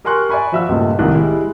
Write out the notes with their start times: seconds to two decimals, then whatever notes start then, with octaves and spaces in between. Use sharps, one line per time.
0.05 G4 A#4 G#5 C6 C#6 F#6
0.29 D5 E5 G#5 B5 C#6
0.52 F3 F#4 E5 F5 E6
0.69 C#2 G2 A#2 A3
0.99 C2 A2 D#3 F#6
1.14 G3 G#3 E4